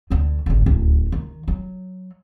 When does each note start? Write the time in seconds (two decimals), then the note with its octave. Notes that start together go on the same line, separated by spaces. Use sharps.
0.10 D2 D3
0.46 G#1 D3
0.66 D1 C#2
1.12 D#3
1.48 F#3